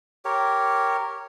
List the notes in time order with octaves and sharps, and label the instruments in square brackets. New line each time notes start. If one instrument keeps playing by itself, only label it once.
[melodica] G4 A#4 C#5